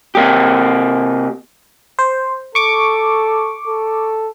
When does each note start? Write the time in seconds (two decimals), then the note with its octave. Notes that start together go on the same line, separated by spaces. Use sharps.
0.15 C3 A#3 G4
1.99 C5
2.55 A4 C#6 D6
3.67 A4